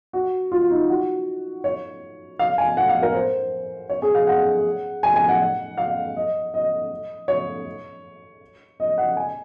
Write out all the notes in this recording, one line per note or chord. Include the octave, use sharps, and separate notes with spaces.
F#4
F4
D#4
F#4
C#5
F5
G#5
F#5
F5
A#4
C5
C#5
G#4
F5
F#5
G#5
G#5
F#5
F5
D#5
D#5
C#5
D#5
F#5
G#5